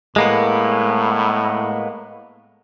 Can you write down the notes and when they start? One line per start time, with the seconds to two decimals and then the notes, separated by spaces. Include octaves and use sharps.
0.16 A2 G#3 A#3 B3